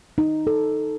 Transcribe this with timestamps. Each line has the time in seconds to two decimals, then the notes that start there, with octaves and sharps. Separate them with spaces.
0.18 D#4
0.47 A4